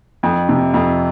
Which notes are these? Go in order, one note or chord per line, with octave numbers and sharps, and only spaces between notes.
F2
C3
F2